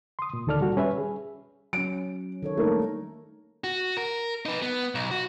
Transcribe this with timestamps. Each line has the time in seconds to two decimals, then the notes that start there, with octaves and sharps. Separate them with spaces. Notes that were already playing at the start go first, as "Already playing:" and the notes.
0.19 C6 D#6
0.33 A#2
0.47 D2 D#3 A4 D5 F6
0.60 A#2 G3 F#4 A4
0.76 G3 C#4 B4 E5
0.98 G#4
1.73 F#3 C#4 D7
2.42 D#3 A4 C#5
2.57 G3 A3 A#3 D4 D#4 A#4
3.64 F#4
3.97 A#4
4.45 D#4 B4
4.62 B3
4.95 B1
5.11 F#4